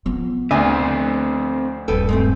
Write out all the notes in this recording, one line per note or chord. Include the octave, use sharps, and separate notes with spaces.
F3 B3
D2 A3 C4 G#5
D#1 G2 A4 B4 G5
G#3 A3 C4